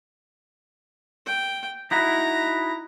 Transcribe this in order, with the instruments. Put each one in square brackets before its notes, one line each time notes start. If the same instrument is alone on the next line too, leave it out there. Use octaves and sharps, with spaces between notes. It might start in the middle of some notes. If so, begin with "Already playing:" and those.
[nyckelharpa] G5
[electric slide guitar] D#4 E4 F#4 [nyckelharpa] A#5